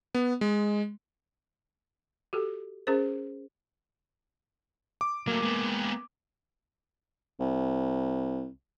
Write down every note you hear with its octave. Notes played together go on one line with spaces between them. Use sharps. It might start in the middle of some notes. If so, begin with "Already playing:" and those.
B3
G#3
F#4 G4 A4
C#4 G#4 A#4 C5
D6
F#3 A3 A#3
G#3 B3
C2